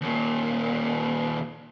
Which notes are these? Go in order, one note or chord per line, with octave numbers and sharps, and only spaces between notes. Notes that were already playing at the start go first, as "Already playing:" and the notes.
D#2 A#2